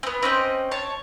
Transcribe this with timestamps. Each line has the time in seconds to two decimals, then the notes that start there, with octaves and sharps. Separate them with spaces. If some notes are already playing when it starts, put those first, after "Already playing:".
0.03 B3 C4
0.23 C4 C#4 D#5 G5
0.71 C#5 A5